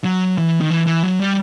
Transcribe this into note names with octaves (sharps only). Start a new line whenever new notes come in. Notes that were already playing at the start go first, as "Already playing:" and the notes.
F#3
E3
D#3
E3
E3
F#3
G3